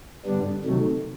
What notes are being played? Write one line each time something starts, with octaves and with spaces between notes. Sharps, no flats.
G2 D3 G3 B3 D4
C3 D#3 F#3 A3